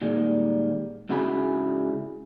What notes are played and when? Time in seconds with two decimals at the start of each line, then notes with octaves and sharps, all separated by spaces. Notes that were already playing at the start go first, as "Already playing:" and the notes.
0.02 A#2 D#3 G3 G#3
1.09 G#2 C#3 E4 F#4 G#4 B5